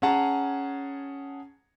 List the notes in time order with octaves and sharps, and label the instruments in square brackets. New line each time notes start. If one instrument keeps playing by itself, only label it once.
[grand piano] C#4 G#4 F#5 A5 A#5